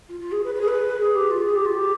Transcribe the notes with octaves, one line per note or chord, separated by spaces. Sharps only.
F4
F4
G#4
B4
B4
G#4
B4
G#4
G4
F4
G#4
G4
F4
G4